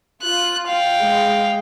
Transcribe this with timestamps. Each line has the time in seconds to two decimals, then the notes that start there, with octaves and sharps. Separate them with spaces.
0.22 F4 F#6
0.68 F5 G5
1.01 G#3